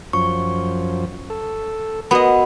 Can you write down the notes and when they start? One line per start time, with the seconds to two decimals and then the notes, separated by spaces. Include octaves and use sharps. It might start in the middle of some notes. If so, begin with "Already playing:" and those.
0.13 F#2 F3 C#6
1.30 A4
2.11 B3 F#4 A#4 D#5 B5